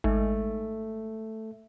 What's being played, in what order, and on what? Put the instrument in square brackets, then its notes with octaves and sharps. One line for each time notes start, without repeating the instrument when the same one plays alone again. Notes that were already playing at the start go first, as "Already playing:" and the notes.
[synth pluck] G#1 [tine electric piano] A3